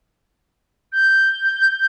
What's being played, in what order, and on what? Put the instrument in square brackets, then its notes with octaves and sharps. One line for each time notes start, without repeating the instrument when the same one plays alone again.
[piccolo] G6